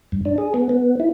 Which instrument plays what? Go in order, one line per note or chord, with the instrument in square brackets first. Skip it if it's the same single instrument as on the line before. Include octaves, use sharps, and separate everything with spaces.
[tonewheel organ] G2
D4
G#4
B3
B3
E4